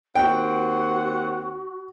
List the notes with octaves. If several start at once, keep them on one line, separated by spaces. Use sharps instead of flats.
D#2 C4 F#4 F#5 G5